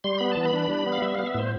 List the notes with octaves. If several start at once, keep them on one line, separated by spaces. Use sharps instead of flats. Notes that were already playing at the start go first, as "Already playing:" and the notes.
G3 C6
B3 B5
A5
E3
B5
D4
G3
B3
F5
G3 E5
B3 F5
E5
A2 C5